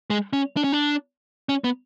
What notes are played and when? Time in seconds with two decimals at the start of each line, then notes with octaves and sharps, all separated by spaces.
0.10 G#3
0.33 C#4
0.57 D4
0.64 C#4
0.72 D4
1.49 C#4
1.64 B3